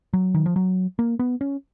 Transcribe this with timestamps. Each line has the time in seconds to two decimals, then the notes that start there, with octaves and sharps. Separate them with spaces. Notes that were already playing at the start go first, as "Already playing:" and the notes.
0.13 F#3
0.34 D#3
0.46 F3
0.56 F#3
0.99 A#3
1.19 B3
1.41 C#4